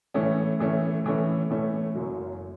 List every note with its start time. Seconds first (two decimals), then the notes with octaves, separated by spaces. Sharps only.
0.14 A2 E3 A3 C#4
0.59 A2 E3 A3 C#4
1.04 A2 E3 A3 C#4
1.50 A2 E3 A3 C#4
1.95 F#1 F#2 F#3